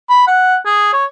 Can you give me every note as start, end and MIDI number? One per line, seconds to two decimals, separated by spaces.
0.09 0.24 83
0.27 0.56 78
0.66 0.90 68
0.93 1.05 73